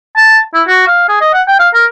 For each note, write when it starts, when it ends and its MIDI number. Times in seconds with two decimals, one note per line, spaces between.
0.17 0.40 81
0.54 0.62 64
0.67 0.85 66
0.87 1.04 77
1.09 1.17 68
1.21 1.31 75
1.34 1.42 78
1.48 1.56 79
1.59 1.69 77
1.74 1.85 70